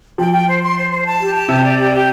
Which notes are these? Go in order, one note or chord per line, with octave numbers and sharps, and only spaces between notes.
F3 G5
G5
C5
C6
C5
C5
A5
G4
A5
C3 G4
D5
G4
G4